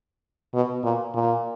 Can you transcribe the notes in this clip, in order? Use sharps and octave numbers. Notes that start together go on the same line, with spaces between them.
B2
A#2
A#2